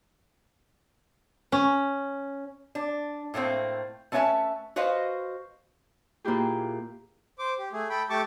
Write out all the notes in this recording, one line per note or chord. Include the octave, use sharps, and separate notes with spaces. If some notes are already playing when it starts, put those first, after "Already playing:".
C#4
D4
A2 A3 A#3 C4
A3 B3 C#4 B4 E5 A5
F#4 B4 C5 D#5 F5
A#2 A#3 E4 G4 G#4
C5 D6
G4
A3 G#4
A4 G5 B5
A3 G4 A5 C#6 D6